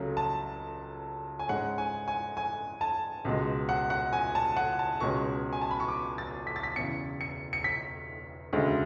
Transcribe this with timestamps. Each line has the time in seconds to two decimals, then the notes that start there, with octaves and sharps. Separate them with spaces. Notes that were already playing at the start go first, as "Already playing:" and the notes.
Already playing: C#2 C#3 F#3 A3
0.17 A5
1.39 G#5
1.48 G#2 G#3 C#4 F#5
1.78 G#5
2.08 G#5
2.37 G#5
2.81 A5
3.25 C#2 B2 G#3
3.69 F#5
3.90 F#5
4.13 G#5
4.35 A5
4.57 F#5
4.79 A5
5.00 C#2 B2 G#3 C#4 C#6
5.53 G#5
5.62 A5
5.71 B5
5.80 C#6
5.88 D6
6.18 A6
6.47 B6
6.56 A6
6.63 B6
6.76 E1 E2 C#3 E3 C#7
7.21 C#7
7.53 C#7
7.64 B6
8.53 E1 D2 C#3 G#3